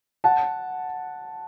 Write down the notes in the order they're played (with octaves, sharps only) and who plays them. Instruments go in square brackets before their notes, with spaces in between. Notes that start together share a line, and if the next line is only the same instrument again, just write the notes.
[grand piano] F#5 A5